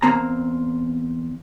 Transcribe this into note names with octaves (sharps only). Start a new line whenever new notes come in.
E2 A#3 C4 A#5